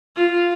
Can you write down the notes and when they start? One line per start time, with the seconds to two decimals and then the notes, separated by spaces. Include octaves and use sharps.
0.15 F4